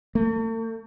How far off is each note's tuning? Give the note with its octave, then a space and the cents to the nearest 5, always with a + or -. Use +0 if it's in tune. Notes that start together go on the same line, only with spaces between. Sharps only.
A3 +45